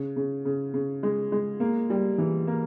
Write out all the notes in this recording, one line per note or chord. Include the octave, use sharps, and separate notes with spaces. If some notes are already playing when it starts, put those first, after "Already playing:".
Already playing: C#3
C#3
C#3
C#3
G#3
G#3
A#3
G3
E3
A#3